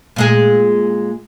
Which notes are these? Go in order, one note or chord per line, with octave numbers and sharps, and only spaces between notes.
A#2 G#3 G#4